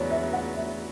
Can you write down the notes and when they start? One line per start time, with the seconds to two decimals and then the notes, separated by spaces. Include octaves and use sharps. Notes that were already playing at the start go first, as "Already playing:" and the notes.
Already playing: E2 C#3 F#3 B3 C#5 D5
0.11 E5
0.33 F#5
0.57 E5